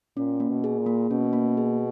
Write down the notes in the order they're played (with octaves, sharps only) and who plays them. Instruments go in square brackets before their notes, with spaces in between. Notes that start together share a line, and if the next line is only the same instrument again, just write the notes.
[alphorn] A#2 [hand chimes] C#4
[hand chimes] A#3
[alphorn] B2
[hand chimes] G#4
[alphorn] A#2
[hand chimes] A#3
[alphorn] B2 [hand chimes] C#4
[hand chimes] A#3
G#4